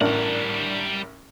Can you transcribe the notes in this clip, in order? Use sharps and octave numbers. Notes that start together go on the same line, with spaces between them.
A1 G3 D4 A#4 F#5